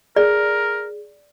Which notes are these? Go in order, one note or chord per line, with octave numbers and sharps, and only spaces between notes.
G#4 A#4 D5